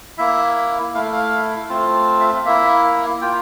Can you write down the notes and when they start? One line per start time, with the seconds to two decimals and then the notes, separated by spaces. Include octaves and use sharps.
0.18 A#3 E4 E5
0.94 A3 E4 F5
1.13 F5
1.69 A3 C4 F4
2.20 E5
2.45 A#3 E4 E5
3.21 A#3 F4 G5